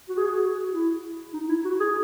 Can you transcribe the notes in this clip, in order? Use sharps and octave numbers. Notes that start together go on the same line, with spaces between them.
F#4
G#4
F#4
E4
D#4
E4
F#4
G#4